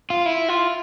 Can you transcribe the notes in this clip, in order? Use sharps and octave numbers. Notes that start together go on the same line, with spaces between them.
F4
E4
F4